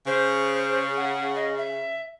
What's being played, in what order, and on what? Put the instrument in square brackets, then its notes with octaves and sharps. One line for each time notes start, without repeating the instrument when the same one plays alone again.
[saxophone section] C#3 [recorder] C5
[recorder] F#5
D#5
E5